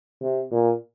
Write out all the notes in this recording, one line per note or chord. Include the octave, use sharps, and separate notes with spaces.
C3
A#2